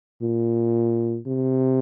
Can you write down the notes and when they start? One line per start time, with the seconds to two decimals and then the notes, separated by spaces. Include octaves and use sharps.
0.22 A#2
1.27 C3